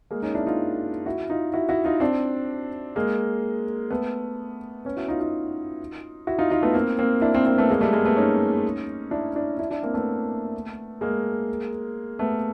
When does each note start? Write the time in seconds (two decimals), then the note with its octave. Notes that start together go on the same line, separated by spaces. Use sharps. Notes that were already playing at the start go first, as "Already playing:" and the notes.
0.11 G#3 A#3
0.22 C#4 D#4
0.35 D4 E4
0.46 D#4 F4
1.06 E4 F#4
1.30 D#4 F4
1.54 E4 F#4
1.69 E4 F#4
1.84 D#4 F4
2.00 C4 D4
2.96 G#3 A#3
3.90 A3 B3
4.85 B3 C#4
4.96 E4 F#4
5.08 D#4 F4
5.20 D#4 F4
6.27 E4 F#4
6.39 D#4 F4
6.50 D#4 F4
6.62 A3 B3
6.74 A#3 C4
6.99 A#3 C4
7.22 D4 E4
7.34 A#3 C4
7.45 A#3 C4
7.58 A3 B3
7.70 G#3 A#3
7.81 G3 A3
7.93 G#3 A#3
8.05 A3 B3
8.17 C#4 D#4
9.11 D4 E4
9.35 D4 E4
9.59 D4 E4
9.70 D4 E4
9.83 A#3 C4
9.94 A3 B3
11.01 G#3 A#3
12.19 A3 B3